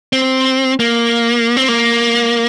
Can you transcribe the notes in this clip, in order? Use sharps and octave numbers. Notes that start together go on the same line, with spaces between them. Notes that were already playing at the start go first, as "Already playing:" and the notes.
C4
A#3
C4
A#3